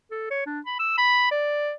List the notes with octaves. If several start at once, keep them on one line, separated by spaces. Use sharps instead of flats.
A4
C#5
D4
B5
E6
B5
D5